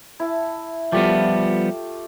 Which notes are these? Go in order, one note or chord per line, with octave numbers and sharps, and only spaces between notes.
E4 A5
F3 G3 A3 B3 F4 G4